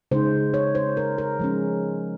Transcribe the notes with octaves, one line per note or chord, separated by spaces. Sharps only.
C#3 G#3 D#4 C5
C#5
C5
A#4
A#4
F3 G#3 C#4